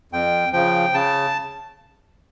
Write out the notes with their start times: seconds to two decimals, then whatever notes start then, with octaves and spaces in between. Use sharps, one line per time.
0.12 F2 G5
0.53 C#3 F3 G5
0.94 C#3 A5